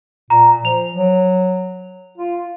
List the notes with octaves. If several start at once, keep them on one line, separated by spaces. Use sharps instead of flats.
A#2 A#5
F3 F7
F#3
F4